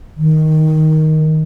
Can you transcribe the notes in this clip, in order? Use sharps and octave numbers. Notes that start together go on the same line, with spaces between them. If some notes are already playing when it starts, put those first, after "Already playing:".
D#3